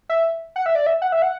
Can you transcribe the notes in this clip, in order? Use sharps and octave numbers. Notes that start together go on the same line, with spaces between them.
E5
F#5
E5
D5
E5
F#5
E5
F#5